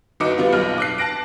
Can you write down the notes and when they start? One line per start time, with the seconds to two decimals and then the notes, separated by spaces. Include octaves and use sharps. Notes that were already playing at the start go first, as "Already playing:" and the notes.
0.20 G1 D#4 F#4 D6 C#7
0.38 G3 B3 F4
0.53 B1 F6
0.78 D6 F#6 C7
0.98 A5 F#6 A#6 D7